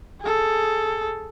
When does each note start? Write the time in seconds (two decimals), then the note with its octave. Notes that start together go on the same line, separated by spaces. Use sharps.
0.21 G#4 A4